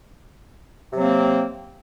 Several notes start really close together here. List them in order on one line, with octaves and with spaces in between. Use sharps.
C3 F#3 C4 A#3